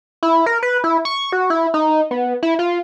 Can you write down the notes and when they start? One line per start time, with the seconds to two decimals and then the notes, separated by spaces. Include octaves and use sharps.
0.23 E4
0.46 A#4
0.63 B4
0.84 E4
1.05 C#6
1.32 F#4
1.50 E4
1.74 D#4
2.11 B3
2.43 E4
2.59 F4